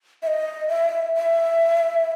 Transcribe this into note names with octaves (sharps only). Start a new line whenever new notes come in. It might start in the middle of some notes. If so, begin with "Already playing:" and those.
E5
D#5
E5
E5